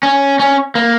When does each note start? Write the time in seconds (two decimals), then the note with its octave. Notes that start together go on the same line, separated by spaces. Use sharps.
0.03 C#4
0.39 C#4
0.75 A#3